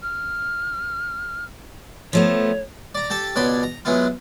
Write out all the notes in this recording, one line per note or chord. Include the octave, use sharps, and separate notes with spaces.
F6
F3 A3 B3 C#5
D5 A#5
G4 A4 A5
C#2 B2 C#5 D5 B5 C6
A#5
F#3 G#3 B3 E4 F4